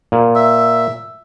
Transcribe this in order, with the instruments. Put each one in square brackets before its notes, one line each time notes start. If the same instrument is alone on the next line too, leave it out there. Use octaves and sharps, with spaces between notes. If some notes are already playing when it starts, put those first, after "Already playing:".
[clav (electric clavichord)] A#2
[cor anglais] E5